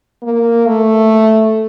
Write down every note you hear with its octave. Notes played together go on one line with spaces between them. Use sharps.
A#3
A3